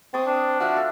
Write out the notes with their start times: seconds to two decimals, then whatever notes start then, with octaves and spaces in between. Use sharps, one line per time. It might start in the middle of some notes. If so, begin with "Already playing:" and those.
0.14 C4 A5 C#6 D#6
0.26 D4
0.60 F3 F#4 E5 F5
0.76 A4